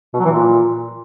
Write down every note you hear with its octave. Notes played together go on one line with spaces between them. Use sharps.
B2
F#3
E3
A#2